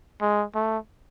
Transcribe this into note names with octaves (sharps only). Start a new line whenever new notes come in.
G#3
A3